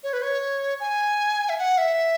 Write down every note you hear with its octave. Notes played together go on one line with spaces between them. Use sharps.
C#5
B4
C#5
G#5
E5
F#5
E5